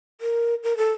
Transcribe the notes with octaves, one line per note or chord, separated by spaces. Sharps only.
A#4
A#4
A4